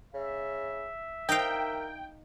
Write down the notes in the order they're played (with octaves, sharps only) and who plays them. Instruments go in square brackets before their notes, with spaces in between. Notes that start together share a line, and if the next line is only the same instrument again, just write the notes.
[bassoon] C#3 [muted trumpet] E5
[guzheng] D#4 F5 [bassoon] A#4 [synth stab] G5